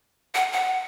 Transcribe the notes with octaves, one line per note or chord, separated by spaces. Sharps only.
F#5
F#5